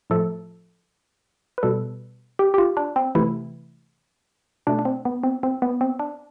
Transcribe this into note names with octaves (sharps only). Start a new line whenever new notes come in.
A2 F3 A3 A4
B4
B2 G3 A4
G4
G4
F4
D4
C4
C3 E3 A3 E4
B2 A3 D4
D4
C4
B3
C4
C4
B3
C4
D4